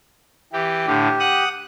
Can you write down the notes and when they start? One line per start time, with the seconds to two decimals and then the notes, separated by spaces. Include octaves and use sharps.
0.53 E3 G4
0.87 A2 D3 G4
1.20 F#5 D#6 F#6